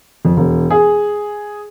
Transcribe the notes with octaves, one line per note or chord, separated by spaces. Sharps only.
F2
E1
G#4